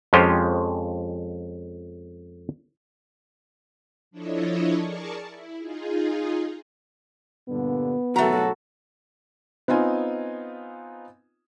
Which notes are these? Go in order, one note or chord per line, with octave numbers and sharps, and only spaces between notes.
F2 G#3 C#4 F4 G4 C5
F3 D4 E4 A4 C#5 D#5
G#4 A#4 D5 A5 C#6
E4
D#4 F4 G#4
G2 A#2 D3 B3
G#1 B2 F#3 A3 F#4 A4 A#5
B3 C4 D#4 F4 G#5